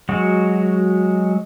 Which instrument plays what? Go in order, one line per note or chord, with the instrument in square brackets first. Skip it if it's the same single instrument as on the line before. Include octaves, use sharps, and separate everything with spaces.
[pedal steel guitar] F#3 G#3 F#4